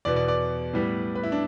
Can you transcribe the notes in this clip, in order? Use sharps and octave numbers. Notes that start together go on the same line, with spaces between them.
E2 B2 B3 D5
D5
D5
A2 G3 B3
B4
E4
D4